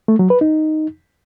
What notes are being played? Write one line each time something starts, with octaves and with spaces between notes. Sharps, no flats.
A3
F#3
B4
D#4